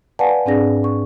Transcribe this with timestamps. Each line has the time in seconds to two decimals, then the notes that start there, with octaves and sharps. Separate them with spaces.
0.19 B4 D5 F5 F#5 G#5 A5
0.46 G#2 C4 D4 G#4 D5 A#6
0.84 C#6